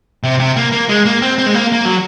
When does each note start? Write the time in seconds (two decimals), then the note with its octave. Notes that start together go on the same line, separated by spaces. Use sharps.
0.23 C3
0.40 C3
0.56 A#3
0.73 A#3
0.89 G#3
1.06 A#3
1.22 C4
1.38 C4
1.46 G#3
1.54 A#3
1.72 A#3
1.85 F#3